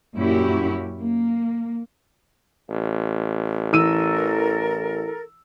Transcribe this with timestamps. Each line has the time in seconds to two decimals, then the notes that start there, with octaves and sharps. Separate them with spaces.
0.15 F#2 A#2 C#4 E4 F#4 G4
1.00 A#3
2.70 A1
3.72 E3 A4 A#4 E6 D#7